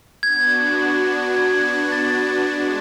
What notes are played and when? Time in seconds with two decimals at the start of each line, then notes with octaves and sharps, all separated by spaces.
0.23 B3 D4 F#4 G#6
1.36 G#6
1.92 A6
2.50 G#3 D4